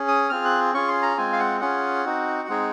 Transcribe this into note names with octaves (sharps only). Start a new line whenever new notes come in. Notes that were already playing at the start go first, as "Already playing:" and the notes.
Already playing: C#4 G#4
D#6
C4 F4 G#4 F6
F#6
C#4 F4 G#4 C#6
C6
A#5
G#3 C4 F4 G#5
F5
F#5
C#4 F4 G#4 F#5
C4 D#4 F#4
G#3 C4 D#4 G#4